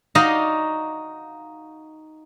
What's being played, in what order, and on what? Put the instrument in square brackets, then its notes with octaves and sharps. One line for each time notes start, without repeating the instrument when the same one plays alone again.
[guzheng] D#4 F#4 D5 D#5 F5